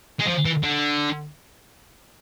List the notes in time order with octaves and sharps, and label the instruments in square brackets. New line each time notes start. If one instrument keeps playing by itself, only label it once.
[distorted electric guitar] G#3
F3
E3
D3